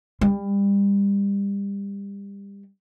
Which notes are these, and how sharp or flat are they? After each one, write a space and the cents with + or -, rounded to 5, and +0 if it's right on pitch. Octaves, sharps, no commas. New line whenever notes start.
G3 +30